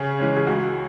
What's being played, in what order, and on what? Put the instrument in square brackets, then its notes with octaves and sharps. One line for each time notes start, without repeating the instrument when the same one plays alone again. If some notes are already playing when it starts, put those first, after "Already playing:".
Already playing: [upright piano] C#3 G#4
E3 G#3 C#4
G#4
C#2 F#4